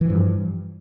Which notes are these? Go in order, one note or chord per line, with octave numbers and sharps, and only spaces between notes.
G2 E3 F3